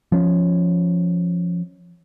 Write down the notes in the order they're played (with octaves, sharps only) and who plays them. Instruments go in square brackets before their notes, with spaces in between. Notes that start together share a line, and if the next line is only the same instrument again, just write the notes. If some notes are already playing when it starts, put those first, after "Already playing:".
[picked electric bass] F3 C#4